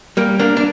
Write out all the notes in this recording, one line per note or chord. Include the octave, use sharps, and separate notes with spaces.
G3 A#3
A#3 D4
D4